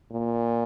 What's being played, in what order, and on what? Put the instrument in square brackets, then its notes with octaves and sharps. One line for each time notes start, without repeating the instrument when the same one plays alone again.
[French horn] A#2